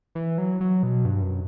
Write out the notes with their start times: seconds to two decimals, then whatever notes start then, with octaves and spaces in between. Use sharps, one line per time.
0.15 E3
0.38 F#3
0.60 F#3
0.83 B2
1.05 G2
1.23 F#2